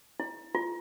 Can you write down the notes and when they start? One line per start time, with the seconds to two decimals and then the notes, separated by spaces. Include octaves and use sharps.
0.20 E4
0.55 F4